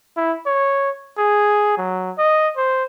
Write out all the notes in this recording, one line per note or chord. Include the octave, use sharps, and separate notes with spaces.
E4
C#5
G#4
F#3
D#5
C5